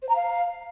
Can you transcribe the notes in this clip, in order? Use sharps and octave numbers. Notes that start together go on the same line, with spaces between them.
C5
A#5
F5